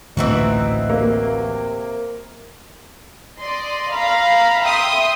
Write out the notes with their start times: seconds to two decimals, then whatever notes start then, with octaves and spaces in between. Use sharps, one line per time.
0.17 A1 D2 A#2 E3 C4 D#4 F#4
0.90 C3 A#3
3.40 D5 D#5 C6
3.93 F5 A#5 B5
4.63 E5 G5 C6 D#6